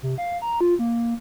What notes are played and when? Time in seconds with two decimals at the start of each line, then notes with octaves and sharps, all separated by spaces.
0.03 C3
0.18 F5
0.42 A#5
0.61 F4
0.79 A#3